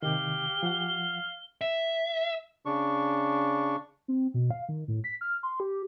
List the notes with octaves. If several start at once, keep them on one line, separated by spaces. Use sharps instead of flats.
C3 D#3 G4 F5 G7
F3 F5 F#5
E5
C#3 D4 C#6
C4
B2
F5
D#3
A2
B6
F6
C6
G4